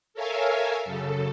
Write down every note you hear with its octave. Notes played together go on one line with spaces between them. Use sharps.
A4 A#4 C#5 E5 F5 G#5
F#2 C#3 A4